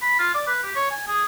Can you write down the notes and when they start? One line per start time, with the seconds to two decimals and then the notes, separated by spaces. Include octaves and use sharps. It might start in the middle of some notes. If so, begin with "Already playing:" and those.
0.02 B5
0.19 F4
0.35 D5
0.47 B4
0.63 G4
0.76 C#5
0.91 G#5
1.08 G#4